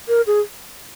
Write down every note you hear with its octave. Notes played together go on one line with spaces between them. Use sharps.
A#4
G#4